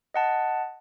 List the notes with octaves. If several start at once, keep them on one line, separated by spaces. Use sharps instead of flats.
D#5 F#5 A5